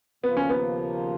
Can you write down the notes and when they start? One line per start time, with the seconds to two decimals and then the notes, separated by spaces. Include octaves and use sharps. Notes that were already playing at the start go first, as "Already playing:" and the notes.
0.24 D#2 C#3 F3 A#3 B3 F4
0.37 C#4
0.49 B3